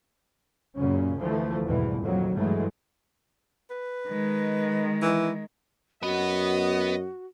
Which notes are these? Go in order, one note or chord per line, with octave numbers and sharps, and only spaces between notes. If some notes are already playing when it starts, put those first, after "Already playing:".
F#2 A#2 C#3 C#4
D2 E3 F3 A3
G#1 E2 B2 D3 E3 G3
F2 A#2 D#3 F#3
G2 E3 F#3 G#3 A3
B4
D#3 G#3
E3
F#2 B3 F#4 D#5